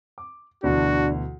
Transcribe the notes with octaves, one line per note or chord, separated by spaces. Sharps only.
D6
D2 B2 E3 D4 F#4